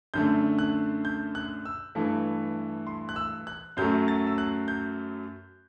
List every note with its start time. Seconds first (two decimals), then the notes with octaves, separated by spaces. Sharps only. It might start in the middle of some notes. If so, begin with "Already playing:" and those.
0.14 F#2 D3 A3 G6
0.59 F#6
1.05 G6
1.35 F#6
1.65 E6
1.95 G2 E3 A3
2.87 C6
3.09 F#6
3.16 E6
3.47 F#6
3.77 F#2 F#3 A3 G6
4.08 A6
4.27 E6
4.38 F#6
4.68 G6